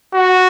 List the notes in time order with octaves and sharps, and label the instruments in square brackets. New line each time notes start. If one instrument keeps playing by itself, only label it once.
[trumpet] F#4